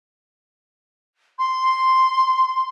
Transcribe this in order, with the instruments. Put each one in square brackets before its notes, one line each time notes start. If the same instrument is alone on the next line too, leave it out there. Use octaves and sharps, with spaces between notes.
[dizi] C6